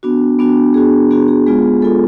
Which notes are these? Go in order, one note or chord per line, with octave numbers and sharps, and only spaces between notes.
B3 D4 F#4
B3 D4 F#4
B3 D4 F#4 G#4
B3 D4 F#4 G#4
G#4
G#3 B3 F4 G#4
G#3 B3 F4 A4